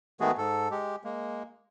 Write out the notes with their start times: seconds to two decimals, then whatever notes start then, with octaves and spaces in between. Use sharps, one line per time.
0.20 D#3 G#3 A3 B3 F#4 G#4
0.38 G#2 A4
0.71 G#3 G4
1.04 G#3 A#3